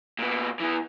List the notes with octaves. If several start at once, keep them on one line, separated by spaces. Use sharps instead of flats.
A#2 B3
E3 B3